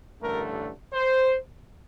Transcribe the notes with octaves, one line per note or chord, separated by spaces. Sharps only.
A1 G2 D3 A3 A#4
C5